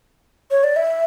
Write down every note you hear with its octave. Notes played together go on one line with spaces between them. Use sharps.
C#5
D5
E5